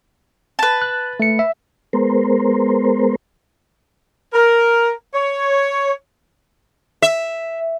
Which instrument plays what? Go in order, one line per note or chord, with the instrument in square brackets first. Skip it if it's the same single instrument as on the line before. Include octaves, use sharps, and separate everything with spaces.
[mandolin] B4 A5
[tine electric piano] F#6
A3 C#7
E5
[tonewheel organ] G#3 B3 A#4 C5
[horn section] A#4
C#5
[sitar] E5